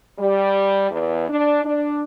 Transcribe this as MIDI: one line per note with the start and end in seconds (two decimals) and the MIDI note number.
0.19 0.91 55
0.91 1.26 40
1.29 1.61 62
1.65 2.02 62